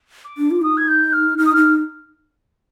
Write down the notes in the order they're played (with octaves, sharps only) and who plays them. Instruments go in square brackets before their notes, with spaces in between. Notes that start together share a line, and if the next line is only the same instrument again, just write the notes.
[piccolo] D6
[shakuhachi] D4
F4
[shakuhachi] D#4 [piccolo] D#6
[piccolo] G#6
G6
F6
[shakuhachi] D#4 [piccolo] F6
[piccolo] D#6
[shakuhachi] D#4 [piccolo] F6